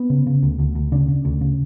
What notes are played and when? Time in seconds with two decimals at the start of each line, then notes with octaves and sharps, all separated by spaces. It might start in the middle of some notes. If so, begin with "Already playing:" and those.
Already playing: B3
0.10 C#3
0.27 C#3
0.43 D2
0.59 D2
0.75 D2
0.92 C#3 D4
1.08 C#3
1.25 D2
1.41 C#3